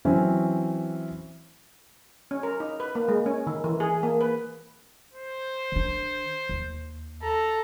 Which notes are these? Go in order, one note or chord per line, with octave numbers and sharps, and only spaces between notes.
E3 F#3 C4 C#4 E4
C#4
A#4
D#4
B4
A#3
G#3
C#4
D#3
E3
G#4
A#3
B4
C5
D#3 D4
D#2
A4 A#5